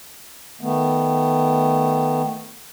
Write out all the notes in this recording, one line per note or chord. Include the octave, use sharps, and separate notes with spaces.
D#3 A3 B3